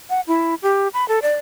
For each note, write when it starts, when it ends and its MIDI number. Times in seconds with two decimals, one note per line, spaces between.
0.10 0.21 78
0.27 0.55 64
0.63 0.88 67
0.94 1.07 83
1.08 1.20 69
1.22 1.34 74